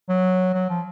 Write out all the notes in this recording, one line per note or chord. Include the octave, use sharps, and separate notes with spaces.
F#3
F#3
F3